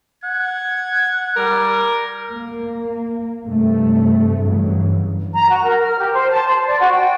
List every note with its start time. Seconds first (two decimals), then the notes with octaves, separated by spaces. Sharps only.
0.24 F#5 G#6
1.36 G3 A#4
2.33 A#3
3.45 G2 C3 A3
4.40 G2 C#3 E3 F#3
5.34 A#5
5.50 F#4
5.64 A#4
5.82 F6
5.98 G4
6.13 C5
6.30 A5
6.48 C5
6.67 D5
6.79 F#4
6.92 G5